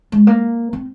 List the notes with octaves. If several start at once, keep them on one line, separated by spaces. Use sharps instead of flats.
G#3
A#3
C4